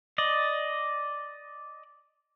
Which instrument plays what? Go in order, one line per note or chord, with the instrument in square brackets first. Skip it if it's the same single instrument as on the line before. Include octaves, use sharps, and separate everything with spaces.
[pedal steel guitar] D5 D#5